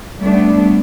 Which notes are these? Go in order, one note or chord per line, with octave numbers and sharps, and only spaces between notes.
G3 A3 B3 D4